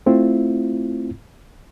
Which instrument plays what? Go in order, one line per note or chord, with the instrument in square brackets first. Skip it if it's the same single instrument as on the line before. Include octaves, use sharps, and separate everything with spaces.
[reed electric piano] A3 C4 E4 F4